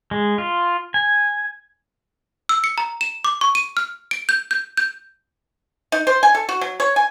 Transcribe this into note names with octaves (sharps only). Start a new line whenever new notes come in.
G#3
F4
G#5
E6
C#7
A#5
E7
D6
C#6
D#7
F6
D7
G6
G6
G6
D#4
C5
G#5
A4
F#4
F#3
C#5
G#5